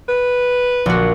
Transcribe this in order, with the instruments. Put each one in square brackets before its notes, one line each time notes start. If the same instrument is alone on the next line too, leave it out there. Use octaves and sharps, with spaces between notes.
[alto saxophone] B4
[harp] A#1 F#4